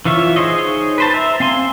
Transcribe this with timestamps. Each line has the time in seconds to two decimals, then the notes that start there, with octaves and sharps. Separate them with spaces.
0.05 E3 F4 C#5 E5
0.36 D#4 G#4 C5 C#5 D#5
0.98 B4 C5 A5
1.14 E5 A#5
1.40 C4 F5 G#5 C6